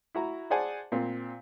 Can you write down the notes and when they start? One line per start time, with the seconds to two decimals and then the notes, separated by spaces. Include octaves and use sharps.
0.15 E4 F#4 A#5
0.50 G#4 C5 D5 F#5 G#5 A5
0.92 A#2 C4